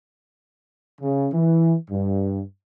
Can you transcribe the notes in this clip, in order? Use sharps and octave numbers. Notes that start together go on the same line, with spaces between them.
C#3
E3
G2